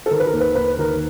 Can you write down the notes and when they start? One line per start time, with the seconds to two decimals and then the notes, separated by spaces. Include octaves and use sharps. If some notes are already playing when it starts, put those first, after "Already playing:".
0.06 A4
0.11 D#3 A#4
0.20 B4
0.26 A#4
0.33 D#2
0.41 B4
0.55 D#2 B4
0.78 D#3 A#4